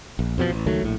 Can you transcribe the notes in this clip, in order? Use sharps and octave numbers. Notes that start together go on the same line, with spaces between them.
A#1
F2 B2 F3
A1
C#2 D#3 F#3 A3
A#1 A2